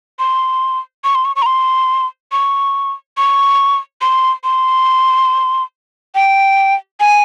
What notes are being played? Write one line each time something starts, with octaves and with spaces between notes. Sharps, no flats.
C6
C#6
C6
C#6
C#6
A#5
C6
C#6
C#6
C6
C6
G5
G#5